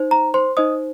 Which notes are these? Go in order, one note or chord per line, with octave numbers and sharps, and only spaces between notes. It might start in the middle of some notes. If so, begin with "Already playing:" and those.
Already playing: D#4 C5
A#5
C5 C6
D#4 C5 D#5 D#6